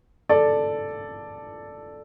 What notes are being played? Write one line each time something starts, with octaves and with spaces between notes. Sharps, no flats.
A4 D5